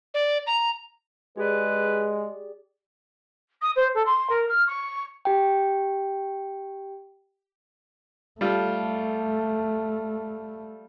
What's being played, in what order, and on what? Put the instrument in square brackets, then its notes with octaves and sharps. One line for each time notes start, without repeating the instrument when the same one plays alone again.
[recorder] D5
A#5
[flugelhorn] G#3 [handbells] G4 G#4 D5 [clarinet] B4
[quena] D#6
C5
A4
C6
A#4
F6
C#6
[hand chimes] G4 G5
[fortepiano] G3 F4 A4 [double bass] A3